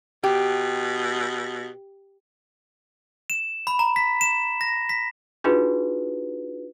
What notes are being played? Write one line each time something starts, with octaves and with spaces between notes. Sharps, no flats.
B2 G4
E7
B5
A#5
B6
E7
A#6
B6
D4 D#4 F4 F#4 G#4 B4